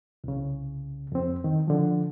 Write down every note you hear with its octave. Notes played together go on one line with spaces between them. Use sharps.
C2 C#3
F2 C4
D#3
D3 F3